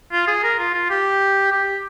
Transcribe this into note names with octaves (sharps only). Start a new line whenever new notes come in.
F4
G#4
A#4
F4
F4
G4
G4